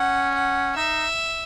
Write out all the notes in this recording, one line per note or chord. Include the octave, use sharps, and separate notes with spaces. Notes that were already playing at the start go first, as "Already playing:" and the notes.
Already playing: C#4 F#5
F#5
D#4 E5